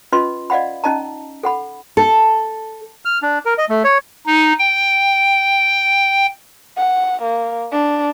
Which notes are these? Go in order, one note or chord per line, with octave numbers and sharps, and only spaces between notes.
C#4 F4 B4 D#5 C6
D5 D#5 F5 F#5 B5
C#4 D#4 D#5 A5 A#5
A4 F#5 B5
A4
F6
D4
A#4
D#5
A3
C#5
D#4
G5
F#5
A#3
D4